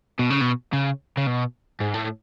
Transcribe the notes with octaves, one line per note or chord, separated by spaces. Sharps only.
B2
C#3
B2
C#3
C#3
B2
G#2
A2